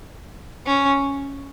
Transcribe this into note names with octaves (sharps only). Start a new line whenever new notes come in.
C#4